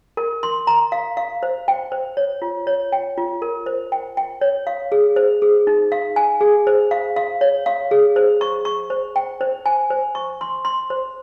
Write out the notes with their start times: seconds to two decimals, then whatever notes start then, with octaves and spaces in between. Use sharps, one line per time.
0.17 A#4
0.43 C6
0.67 A#5
0.92 F5
1.17 F5
1.43 C5
1.68 G5
1.92 C5
2.17 C#5
2.42 F4
2.67 C#5
2.92 G5
3.18 F4
3.42 A#4
3.66 C5
3.92 G5
4.17 G5
4.41 C#5
4.67 F5
4.92 G#4
5.16 C5
5.42 G#4
5.67 D#4
5.92 F5
6.16 G#5
6.41 G#4
6.67 C5
6.91 F5
7.16 F5
7.41 C#5
7.66 F5
7.91 G#4
8.16 C5
8.41 C#6
8.65 C#6
8.90 C5
9.16 G5
9.41 C5
9.66 G#5
9.90 C5
10.15 C#6
10.41 C6
10.65 C6
10.90 C5